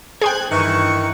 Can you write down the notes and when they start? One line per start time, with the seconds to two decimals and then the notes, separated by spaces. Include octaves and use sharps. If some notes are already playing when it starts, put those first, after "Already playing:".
0.22 G#4 C5 G5 F#6 G#6
0.51 G2 D#3 E3 C#6